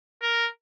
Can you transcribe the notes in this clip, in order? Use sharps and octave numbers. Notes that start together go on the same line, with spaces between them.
A#4